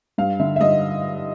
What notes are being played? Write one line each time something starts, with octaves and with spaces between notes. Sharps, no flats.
G2 F5
D3 E5
E5
G2 D#5